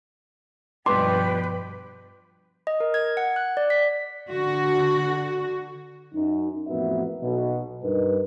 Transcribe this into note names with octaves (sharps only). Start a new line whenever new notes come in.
G2 B2 F3 B4 G5 C6 D6
D#5
A#4
G#6
F#5
F#6
D5
B6
D3 F#4
F#2 D#4
A1 F2 A#3 B3 F#4 E5
B1 B2
G2 D#4 A#4 B4